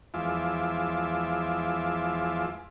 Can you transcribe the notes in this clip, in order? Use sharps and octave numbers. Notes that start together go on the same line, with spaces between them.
E2 F3 G#3 F4 E5 D6